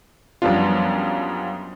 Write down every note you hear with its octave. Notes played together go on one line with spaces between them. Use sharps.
F#2 F3 G3 B3 D4 F4